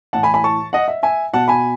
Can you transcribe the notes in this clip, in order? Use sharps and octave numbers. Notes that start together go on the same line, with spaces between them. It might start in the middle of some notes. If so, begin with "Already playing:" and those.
A2 E3 F#5 A5
G#5 B5
G#5 B5
A5 C#6
D#5 F#5
E5
E5 G#5
B2 F#5 A5
G#5 B5